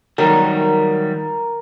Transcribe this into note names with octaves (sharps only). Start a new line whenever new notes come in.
D#3 F#3 G3 A#4